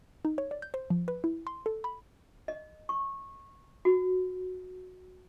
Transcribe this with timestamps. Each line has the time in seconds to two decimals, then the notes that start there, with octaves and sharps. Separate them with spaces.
0.25 D#4
0.38 C#5
0.51 D5
0.62 G6
0.74 C5
0.90 F3
1.08 B4
1.24 E4
1.47 C6
1.66 A4
1.84 B5
2.48 D#5
2.89 C#6
3.85 F#4